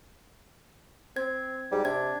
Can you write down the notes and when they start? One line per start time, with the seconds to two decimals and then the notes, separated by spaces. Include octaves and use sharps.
1.16 C4 G#6
1.71 G#2 G3
1.85 C3 D4 G#6